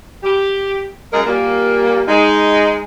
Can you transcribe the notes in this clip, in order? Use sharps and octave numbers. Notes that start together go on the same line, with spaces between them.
G4
F#2 G#3 G#4 A#4
A#2 G3 A#3
G#3 D#4